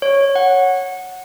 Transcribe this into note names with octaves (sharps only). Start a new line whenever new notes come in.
C#5
F#5